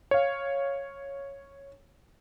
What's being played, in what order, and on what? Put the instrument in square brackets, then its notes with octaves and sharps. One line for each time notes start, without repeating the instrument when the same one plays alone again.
[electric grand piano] C#5 F5